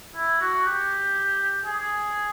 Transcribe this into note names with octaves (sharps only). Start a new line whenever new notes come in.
E4
F#4
G4
G#4